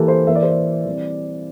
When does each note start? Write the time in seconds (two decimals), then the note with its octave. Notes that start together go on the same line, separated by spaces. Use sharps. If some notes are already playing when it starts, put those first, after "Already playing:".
Already playing: E3 A#3 G4 A4
0.08 C5
0.27 E3 A#3 E5
0.35 D5
0.43 C5
0.50 D5
0.86 E3 G3 C4